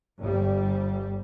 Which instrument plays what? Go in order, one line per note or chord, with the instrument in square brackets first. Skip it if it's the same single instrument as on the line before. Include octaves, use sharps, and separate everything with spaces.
[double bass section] G1 G3